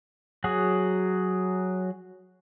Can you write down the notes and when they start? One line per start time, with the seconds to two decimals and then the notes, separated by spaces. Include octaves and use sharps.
0.44 F#3 F#4 G#4